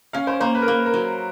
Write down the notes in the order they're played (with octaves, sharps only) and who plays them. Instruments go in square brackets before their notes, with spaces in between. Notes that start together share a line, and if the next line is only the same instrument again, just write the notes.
[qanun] C#4 [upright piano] F5
[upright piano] C5
[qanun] A#3 [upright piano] C5
[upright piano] B4
A#4
[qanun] A#3 [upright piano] B4
[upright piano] A#4
[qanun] F#3